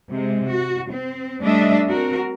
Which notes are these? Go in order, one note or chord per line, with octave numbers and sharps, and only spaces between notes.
C3 G#3
F#4
C4
G3 A3 D4 D#5 E5
C4 F#4 A#4